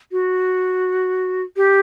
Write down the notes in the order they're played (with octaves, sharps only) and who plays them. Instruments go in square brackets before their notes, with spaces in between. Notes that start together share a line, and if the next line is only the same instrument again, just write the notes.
[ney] F#4
G4